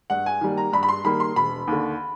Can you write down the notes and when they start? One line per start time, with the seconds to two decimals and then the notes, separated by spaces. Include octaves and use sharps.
0.10 G2 F#5
0.26 G#5
0.41 D#3 G3 A#3
0.57 A#5
0.73 G2 B5
0.83 B5
0.88 C6
1.04 D#3 G3 A#3 B5
1.20 C6
1.36 E1 B5
1.67 D#2 D3